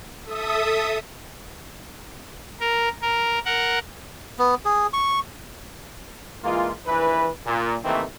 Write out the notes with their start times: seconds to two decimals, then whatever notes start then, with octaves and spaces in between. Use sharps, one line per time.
0.25 A4 E5 D#6
2.60 A#4
3.02 A#4
3.45 A#4 F#5
4.39 B3
4.65 G#4
4.93 C#6
6.44 E3 G#3 A#3 F4
6.87 A#1 E3 E4 B4
7.46 A#2
7.85 C3 D#3 E3 A3 A#3 C4